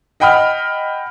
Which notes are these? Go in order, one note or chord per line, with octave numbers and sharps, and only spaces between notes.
D#5 F#5 G5 B5 D#6 F6